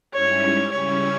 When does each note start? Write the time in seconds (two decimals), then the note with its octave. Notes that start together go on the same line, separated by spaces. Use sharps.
0.14 G#2 G3 C#4 E4 C#5
0.72 C#3 G3 C#4 E4 C#5